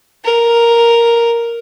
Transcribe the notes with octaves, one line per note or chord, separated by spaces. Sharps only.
A#4